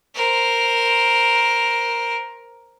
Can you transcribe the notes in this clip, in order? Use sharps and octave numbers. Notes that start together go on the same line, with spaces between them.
A#4 C5